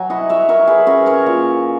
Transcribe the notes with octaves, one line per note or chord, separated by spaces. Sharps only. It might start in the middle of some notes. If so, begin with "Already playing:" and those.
Already playing: F#3 G#5 A#5
E4 D#5 F#5
C#5 E5
E4 A#4 C#5
G#4 B4
C#4 F#4 A#4
A#4 C#5
A#2